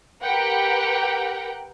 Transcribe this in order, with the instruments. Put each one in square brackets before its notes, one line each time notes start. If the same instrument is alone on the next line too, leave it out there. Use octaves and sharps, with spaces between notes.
[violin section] G4 A#4 B4 F#5 G5